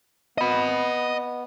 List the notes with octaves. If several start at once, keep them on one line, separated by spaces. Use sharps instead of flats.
B3 D#5 B5